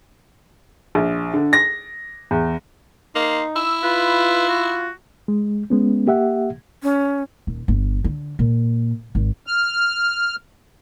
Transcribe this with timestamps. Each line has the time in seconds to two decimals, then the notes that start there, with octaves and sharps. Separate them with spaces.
0.95 A#1
1.34 D3
1.53 A#6
2.31 E2
3.15 A#3 D#4 C6
3.56 E4 E6
3.83 F4 B4
4.49 F#4
5.28 G#3
5.70 G#3 B3 C#4
6.07 A#3 G4 E5 F#5
6.83 C#4
7.47 D#1
7.68 G1
8.04 D3
8.39 A#2
9.15 G#1
9.47 F6